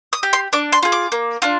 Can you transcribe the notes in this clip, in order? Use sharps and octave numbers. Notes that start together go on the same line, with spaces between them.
D#6
G4
C6
D4 D6
C6
F4 G#4
D6
A#3
D4 F4